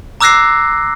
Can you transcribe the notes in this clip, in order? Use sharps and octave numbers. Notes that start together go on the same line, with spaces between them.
A#5 D6 E6 F#6 A#6 C7